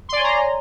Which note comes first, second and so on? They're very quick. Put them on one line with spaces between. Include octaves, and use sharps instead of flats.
C6 D5 G#5 C#5 A#5